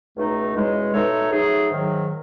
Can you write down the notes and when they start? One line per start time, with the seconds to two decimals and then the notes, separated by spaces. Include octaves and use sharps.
0.15 C#2 B2 A3 D#4
0.54 E2 B2 G#3 C#4
0.93 B2 A3 D#4 A4 C#5
1.31 F#3 A3 D#4 G#4
1.70 G#2 D#3 F#3